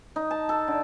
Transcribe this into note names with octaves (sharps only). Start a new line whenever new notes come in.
D#4
A5
A4
D3